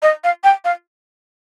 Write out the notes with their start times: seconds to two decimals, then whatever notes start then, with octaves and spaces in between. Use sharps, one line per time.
0.02 D#5
0.24 F5
0.44 G5
0.65 F5